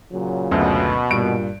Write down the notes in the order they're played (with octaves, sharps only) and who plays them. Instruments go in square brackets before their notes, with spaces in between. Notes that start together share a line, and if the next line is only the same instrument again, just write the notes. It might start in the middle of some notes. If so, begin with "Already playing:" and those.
[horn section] A#2 C#3 F#3
[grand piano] F#1 D2 [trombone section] B2
[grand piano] G2 D7 [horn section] A#2